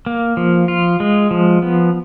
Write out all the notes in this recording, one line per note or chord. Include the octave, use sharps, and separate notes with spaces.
A#3
F3
F4
G#3
F3
B3